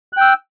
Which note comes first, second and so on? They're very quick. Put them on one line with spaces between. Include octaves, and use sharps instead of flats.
F#6 G5 E6